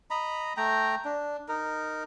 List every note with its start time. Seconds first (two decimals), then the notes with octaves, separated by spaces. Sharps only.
0.10 D#5 A#5 B5
0.57 A3 G5 A#5
1.05 D4
1.48 D#4 A#4